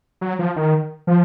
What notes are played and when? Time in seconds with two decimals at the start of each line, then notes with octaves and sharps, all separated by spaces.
0.21 F#3
0.39 F3
0.56 D#3
1.07 F3